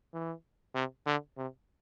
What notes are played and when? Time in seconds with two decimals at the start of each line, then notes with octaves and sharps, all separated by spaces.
0.14 E3
0.75 C3
1.06 D3
1.37 C3